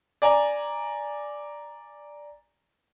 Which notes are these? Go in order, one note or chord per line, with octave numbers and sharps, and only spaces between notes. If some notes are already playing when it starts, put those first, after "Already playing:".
D5 G#5 A#5